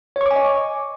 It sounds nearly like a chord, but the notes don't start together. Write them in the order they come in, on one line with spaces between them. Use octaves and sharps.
C#5 C#6 D6 G#5 D#5